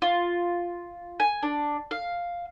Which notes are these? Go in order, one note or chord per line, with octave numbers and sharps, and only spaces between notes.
F4
G#5
D4
F5